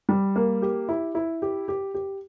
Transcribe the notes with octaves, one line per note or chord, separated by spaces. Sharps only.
G3
A#3
G4
E4
E4
G4
G4
G4